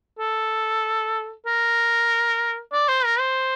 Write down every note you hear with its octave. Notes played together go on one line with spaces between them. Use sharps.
A4
A#4
D5
C5
A#4
C5